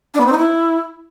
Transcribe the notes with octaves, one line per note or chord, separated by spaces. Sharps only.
D4
B3
C4
D#4
E4